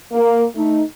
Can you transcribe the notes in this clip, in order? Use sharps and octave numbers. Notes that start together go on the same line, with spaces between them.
A#3
A3 D#4